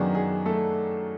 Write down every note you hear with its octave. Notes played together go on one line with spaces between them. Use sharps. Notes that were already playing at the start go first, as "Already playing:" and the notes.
Already playing: F#2 D#3 F#3 B3 D4 G#4
G#4
A3 A4